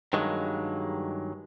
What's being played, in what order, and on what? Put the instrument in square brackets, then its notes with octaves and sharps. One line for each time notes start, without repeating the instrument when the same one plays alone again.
[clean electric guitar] G2 D#3 F#3 G#3 A#3